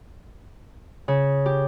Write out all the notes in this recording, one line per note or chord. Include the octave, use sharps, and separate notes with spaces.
C#3
G4